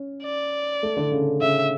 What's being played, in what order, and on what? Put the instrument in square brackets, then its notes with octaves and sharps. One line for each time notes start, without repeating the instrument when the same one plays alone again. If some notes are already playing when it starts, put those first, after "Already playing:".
Already playing: [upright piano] C#4
[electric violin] D5
[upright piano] A3
D3
C#3
[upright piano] C#3 [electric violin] E5